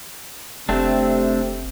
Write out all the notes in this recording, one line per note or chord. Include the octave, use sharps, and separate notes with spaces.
F1 C3 A3 C4 D4